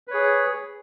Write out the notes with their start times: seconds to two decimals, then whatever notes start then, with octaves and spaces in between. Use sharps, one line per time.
0.08 B4
0.11 C#5
0.14 G#4